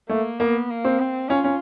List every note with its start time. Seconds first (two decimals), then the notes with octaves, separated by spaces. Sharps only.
0.09 A3 A#3
0.40 A#3 B3
0.70 A#3
0.85 C4
0.99 C4
1.29 C#4 F4
1.44 C#4